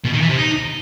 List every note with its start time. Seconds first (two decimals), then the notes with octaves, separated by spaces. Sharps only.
0.05 B2
0.13 D#3
0.21 E3
0.29 C3
0.38 D#4